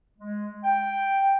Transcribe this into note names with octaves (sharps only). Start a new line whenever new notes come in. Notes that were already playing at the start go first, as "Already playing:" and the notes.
G#3
G5